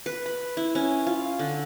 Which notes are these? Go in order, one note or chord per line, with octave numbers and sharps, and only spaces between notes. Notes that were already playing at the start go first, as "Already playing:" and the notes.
B4
B5
E4
C#4
F4
D3